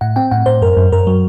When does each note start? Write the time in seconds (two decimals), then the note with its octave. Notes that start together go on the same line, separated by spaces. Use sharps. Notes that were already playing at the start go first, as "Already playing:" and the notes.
0.01 A2 F#5
0.16 C4 G5
0.31 A2 F#5
0.46 A2 C5
0.62 F#2 A#4
0.77 F#2
0.92 F#2 A#4
1.07 F#3